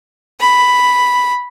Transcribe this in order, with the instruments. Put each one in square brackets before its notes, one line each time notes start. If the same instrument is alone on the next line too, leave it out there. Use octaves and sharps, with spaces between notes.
[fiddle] B5